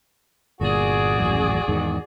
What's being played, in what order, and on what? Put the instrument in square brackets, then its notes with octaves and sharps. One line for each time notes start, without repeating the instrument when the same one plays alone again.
[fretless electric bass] G1 A#2 [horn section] F#4 G#4 D5
[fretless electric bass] D#1 A1 F#2
E2 G#2 D#3